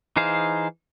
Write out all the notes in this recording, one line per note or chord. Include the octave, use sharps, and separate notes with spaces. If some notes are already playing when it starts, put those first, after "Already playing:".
E3 D#4 G#4 C5 F5